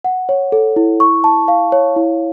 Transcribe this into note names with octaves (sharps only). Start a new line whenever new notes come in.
F#5
C#5
A4
E4
C#6
A5
F5
C#5
E4